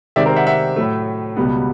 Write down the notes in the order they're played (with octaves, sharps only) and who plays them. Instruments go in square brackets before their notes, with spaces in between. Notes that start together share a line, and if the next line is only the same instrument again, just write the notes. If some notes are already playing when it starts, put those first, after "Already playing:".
[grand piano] C3 D#3 G#3 C4 D5 E5
A#4 C5
E5 F#5
E5 F#5
A2 F#3 A3
C#2 B2 G3 B3